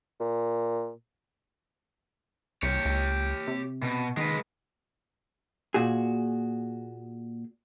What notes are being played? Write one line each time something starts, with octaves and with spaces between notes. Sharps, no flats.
A#2
C2 G4 C#5
C#2
C3
B2
D#3 G#3 B4
A#2 F#4 G#4